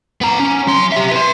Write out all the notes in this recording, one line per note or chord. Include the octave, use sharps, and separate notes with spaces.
B3 A#5
C#4
F#3 C6
G4 E5
B4 C6